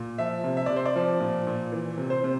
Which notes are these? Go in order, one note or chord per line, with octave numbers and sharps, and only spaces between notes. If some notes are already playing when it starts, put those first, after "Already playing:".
Already playing: A#2
F3 E5
C3
E5
C3 D5
C5
D5
F3
A#2
A#2
E3
C3
C5
C3